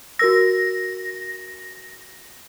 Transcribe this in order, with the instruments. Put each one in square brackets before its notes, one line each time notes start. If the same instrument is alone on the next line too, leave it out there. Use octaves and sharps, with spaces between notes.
[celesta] F#4 A#4 E6 [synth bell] A#6